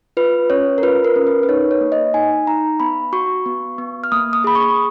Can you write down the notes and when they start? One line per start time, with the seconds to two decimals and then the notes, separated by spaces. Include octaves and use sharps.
0.17 F4 B4
0.50 C#4 C#5
0.78 A#4
0.83 F4 B4
1.04 A#4
1.16 C#4
1.27 B4
1.43 B4
1.49 D#4 C#5
1.71 C#5
1.81 A#3
1.92 D#5
2.14 D#4 G#5
2.47 D#4 A#5
2.80 B3 B5
3.13 F#4 C#6
3.46 B3
3.78 B3
4.04 F6
4.12 A#3 D#6
4.33 D#6
4.44 G#4 B5
4.55 C#6